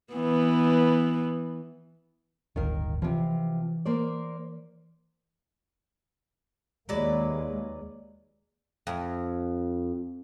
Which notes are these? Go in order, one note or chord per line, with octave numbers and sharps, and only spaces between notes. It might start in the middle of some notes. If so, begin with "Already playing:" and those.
E3 B3
D1 G1 D#3 A#4 F5
C3 E3 F3
A#3 C5 D5
D#2 F#3 G#3 A#3 B4 D5
F2